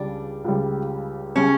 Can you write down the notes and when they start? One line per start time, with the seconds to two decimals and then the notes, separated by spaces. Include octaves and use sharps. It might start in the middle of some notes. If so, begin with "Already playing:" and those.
Already playing: C#2 C#3 G3 D4
0.44 C#2 C#3 G3
1.36 C#3 G3 C#4